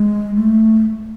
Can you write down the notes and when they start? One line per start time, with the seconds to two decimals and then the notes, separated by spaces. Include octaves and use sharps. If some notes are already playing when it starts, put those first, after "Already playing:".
Already playing: G#3
0.36 A3